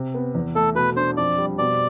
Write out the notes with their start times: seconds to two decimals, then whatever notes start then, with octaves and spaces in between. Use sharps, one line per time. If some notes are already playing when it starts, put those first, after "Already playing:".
Already playing: C3
0.14 B3
0.35 E2
0.55 A3 A4
0.75 B2 B4
0.96 D4 C5
1.17 F2 D5
1.38 G3
1.58 B2 D5